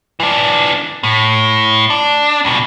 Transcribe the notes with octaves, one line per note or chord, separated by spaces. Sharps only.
E3 D4
A2
D4
C#2 B2